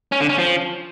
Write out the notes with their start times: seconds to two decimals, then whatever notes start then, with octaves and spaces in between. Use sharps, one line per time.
0.12 C#4
0.21 D3
0.29 C#4
0.38 F3